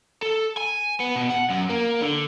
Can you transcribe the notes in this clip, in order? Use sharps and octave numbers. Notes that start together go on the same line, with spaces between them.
A4
G#5
B3
B2
F#5
F#2
A#3
D3